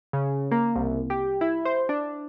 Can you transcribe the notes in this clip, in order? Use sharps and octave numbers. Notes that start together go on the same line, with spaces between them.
C#3
A#3
C2
G4
E4
C5
D4